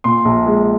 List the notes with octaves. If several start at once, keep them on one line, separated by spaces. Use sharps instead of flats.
A#2 C6
A#1
G#3